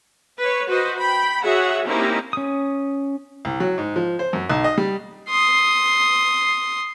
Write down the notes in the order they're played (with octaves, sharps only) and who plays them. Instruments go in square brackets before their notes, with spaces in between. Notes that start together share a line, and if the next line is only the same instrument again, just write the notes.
[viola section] B4 C#5
F#4 B4 C5 D#5
G5 B5
F#4 G#4 C#5 E5 F#5
A#3 C4 C#4 D#4 E4 G4
[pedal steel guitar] C#4 D#6
[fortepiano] C2
F#3
G#2
F3
C5
F#2
B1
D#5
G3
[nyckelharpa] C6 D#6